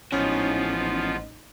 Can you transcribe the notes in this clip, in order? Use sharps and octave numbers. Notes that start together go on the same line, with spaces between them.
A1 G#2 E3 F3 B3 C#4 D#4 F4